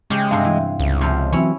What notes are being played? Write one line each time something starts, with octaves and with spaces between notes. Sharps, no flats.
C#3 G#3 G4
G2 C3 D#5 F5
E3
C#2
C3 F3
E3 F#3 C4 C#4 E4